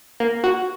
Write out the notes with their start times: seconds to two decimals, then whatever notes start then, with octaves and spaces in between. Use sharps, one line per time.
0.20 A#3
0.44 F#4